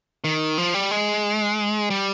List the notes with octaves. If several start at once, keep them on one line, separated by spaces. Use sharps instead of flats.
D#3
F3
G3
G#3
G3